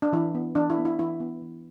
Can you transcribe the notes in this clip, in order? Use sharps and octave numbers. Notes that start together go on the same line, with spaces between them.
D4
E3 E4
B3
E3 D4
E4
B3
E4
E3 E4
B3
E3